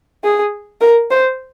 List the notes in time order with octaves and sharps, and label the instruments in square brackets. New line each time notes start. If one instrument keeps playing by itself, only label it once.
[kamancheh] G#4
A#4
C5